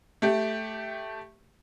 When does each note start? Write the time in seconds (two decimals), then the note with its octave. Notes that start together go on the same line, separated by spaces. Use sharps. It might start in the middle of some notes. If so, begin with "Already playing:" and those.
0.22 A3 G4